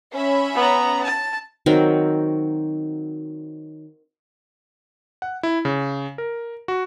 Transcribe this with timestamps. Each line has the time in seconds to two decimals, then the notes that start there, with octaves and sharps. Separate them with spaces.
0.13 C#4 E5 B5
0.55 B3 A#5
1.04 A5
1.66 D#3 F#3 C4 A#4
5.22 F#5
5.43 E4
5.65 C#3
6.18 A#4
6.68 F#4